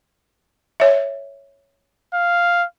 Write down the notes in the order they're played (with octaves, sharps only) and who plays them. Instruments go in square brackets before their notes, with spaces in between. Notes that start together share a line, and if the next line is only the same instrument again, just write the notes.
[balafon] C#5 E5
[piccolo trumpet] F5